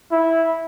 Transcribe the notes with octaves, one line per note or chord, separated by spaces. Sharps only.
E4